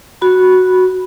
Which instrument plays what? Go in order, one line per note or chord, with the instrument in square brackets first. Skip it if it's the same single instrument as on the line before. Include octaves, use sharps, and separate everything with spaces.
[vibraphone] F#4 B5